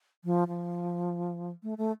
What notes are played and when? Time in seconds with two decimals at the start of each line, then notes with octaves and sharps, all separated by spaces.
0.25 F3
0.48 F3
1.63 A3
1.78 A3